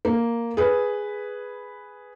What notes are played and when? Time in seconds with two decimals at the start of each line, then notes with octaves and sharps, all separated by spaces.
0.05 A#3
0.57 G#4 B4